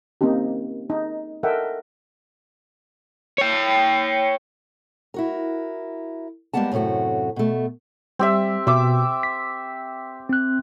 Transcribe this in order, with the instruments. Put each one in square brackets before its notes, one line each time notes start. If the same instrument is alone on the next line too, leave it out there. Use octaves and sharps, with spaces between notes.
[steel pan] A#3 C4 C#4 D#4 G4
D#4
A4 A#4 D#5 E5 F#5 G5
[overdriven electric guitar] C#5 G5
[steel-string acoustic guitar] E4 F#4 A#4
G3 G#3 A#3 B3 F#5 A5
F#2 A2 C3 A3 F#4
B2 A3
[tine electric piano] G3 [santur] C4 G4 E5
[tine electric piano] B2 [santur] E5 D6
[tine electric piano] B6
C4 F#6